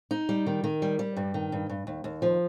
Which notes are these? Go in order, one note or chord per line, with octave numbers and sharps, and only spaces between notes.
D#4
G3
D#3
D#3
G3
G3
G2
D#3
G2
G2
D#2
D#2
F3